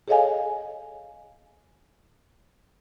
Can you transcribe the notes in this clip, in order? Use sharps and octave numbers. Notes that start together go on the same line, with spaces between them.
G#4 A4 C#5 D#5 F5 G#5